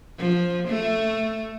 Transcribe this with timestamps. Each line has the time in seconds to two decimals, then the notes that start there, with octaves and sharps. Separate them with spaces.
0.18 F3
0.68 A3